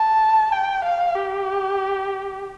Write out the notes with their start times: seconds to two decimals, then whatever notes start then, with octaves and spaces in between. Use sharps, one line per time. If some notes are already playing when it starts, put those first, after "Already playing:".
Already playing: A5
0.52 G5
0.84 F5
1.15 G4